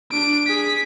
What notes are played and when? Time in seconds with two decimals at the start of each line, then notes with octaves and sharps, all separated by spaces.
0.11 D4 D7
0.47 G#4 B6